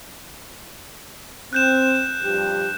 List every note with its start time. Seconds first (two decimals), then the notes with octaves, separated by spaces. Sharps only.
1.53 C4 F#6 G6 E7
2.22 G2 F3 G4